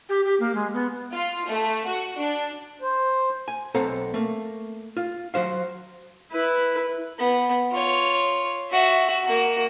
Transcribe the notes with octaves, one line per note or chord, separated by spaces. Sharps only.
G4
G4
A#3
G#3
B3
F4
A3
F#4
D4
C5
G#5
B1 C4 A4 F#5 A#5
A3 A#3
F4
F#3 F#4 C5 F5
E4 B4
B3
F4 C#5
F#4 E5
A#3 F#4